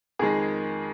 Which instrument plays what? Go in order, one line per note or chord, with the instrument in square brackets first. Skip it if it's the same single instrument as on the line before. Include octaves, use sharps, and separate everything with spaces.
[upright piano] F2 D#3 G#3 G#4